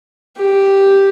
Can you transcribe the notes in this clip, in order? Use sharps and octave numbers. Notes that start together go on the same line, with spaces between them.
G4